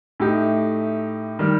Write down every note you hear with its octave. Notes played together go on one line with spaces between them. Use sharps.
A2 A3 D#4 G4
D#3 G3